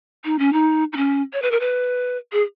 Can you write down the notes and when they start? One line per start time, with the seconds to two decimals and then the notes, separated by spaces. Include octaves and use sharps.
0.25 D#4
0.39 C#4
0.53 D#4
0.93 D#4
0.97 C#4
1.33 C#5
1.42 B4
1.51 A#4
1.60 B4
2.32 G#4